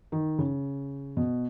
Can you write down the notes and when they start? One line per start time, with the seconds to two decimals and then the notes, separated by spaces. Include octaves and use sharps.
0.12 D#3
0.38 C#3
1.17 B2